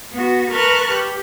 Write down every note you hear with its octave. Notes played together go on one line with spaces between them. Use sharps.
B3 F#4
A#4 B4 A5 C#6 F6 F#6
G4